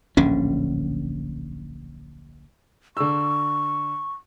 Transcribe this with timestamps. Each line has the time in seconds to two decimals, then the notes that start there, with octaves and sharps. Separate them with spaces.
0.17 D1 A#1 D3 C#4
2.97 D3 C#6 E6